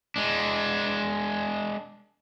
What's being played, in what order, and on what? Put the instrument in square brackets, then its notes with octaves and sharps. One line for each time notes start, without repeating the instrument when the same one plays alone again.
[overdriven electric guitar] G#3 D4